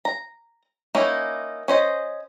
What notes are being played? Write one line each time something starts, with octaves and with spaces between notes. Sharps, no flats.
A#5
A#3 C#4 D#4 E4
C#4 C5 D#5